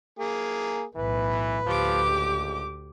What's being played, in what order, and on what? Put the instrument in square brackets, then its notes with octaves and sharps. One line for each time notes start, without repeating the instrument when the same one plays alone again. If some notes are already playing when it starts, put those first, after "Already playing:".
[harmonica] A#3 G#4
[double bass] B1 A2 [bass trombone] E3 [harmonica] B4
[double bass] D2 [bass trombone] F3 [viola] G4 D6
[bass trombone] C#2